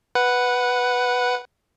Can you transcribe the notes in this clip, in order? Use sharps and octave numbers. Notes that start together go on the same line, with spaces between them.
B4 F#5